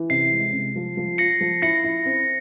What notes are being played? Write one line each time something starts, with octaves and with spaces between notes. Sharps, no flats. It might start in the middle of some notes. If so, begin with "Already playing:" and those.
Already playing: E3
C3 C7
G#3
C3
F3
F3
F4 A#6 C#7
F3
E4 A#6 C#7
E4
C4